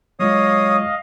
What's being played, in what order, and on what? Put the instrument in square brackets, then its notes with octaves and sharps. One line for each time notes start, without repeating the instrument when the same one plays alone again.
[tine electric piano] F#3 G#3 F4 [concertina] C#5 D#6 [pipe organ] D#5 F5